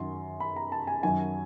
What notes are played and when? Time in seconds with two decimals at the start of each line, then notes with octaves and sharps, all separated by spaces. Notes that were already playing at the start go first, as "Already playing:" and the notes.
Already playing: F#2 D#3 F#3 C6
0.40 B5
0.56 A#5
0.72 A5
0.87 G#5
1.03 F#2 D#3 F#3 G#5